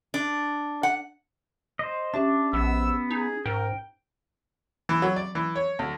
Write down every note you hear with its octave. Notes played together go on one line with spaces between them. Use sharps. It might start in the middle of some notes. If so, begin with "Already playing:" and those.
D4
F#5
C5 D#5
C#4 D4 G4 D5 E5
A#1 B3 E6
D#4 G#4
G#2 A#4 G5
E3
F#3
D5
E3
C#5
D2